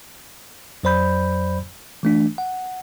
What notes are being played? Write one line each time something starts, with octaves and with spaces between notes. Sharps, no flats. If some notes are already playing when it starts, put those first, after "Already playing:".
F2 F#3 C5 D5 B5 G6
E3 A3 D4
F#5